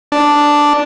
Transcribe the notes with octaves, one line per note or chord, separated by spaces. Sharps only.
D4